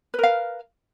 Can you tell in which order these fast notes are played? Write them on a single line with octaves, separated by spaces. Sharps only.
B4 A#4 F5